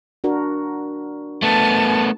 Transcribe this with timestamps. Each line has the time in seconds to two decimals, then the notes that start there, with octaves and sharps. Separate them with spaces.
0.24 D4 F#4 A#4
1.42 A3 B3 A5